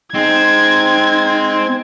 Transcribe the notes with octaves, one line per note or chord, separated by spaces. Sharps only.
G#3 C4 D#4 G#6